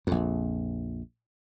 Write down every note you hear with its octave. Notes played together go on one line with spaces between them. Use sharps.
A#1 F2